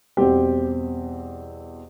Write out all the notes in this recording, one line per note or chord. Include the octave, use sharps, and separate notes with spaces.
E2 B2 G3 C4 G4